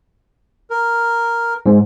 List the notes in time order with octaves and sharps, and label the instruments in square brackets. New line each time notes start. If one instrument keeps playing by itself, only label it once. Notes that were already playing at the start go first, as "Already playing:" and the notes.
[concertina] A#4
[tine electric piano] G#2